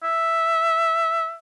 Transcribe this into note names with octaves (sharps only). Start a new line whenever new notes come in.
E5